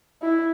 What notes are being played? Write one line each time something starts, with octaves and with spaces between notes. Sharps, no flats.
E4